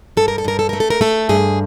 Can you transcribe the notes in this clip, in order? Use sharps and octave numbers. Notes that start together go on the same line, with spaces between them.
G2 A4
A#4
A4
G2 A#4
A4
A3 A#4
A4
A#4
A3 A4
G2 G#4